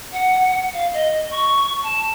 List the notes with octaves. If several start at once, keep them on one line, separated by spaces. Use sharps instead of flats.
F#5
F5
D#5
C#6
A5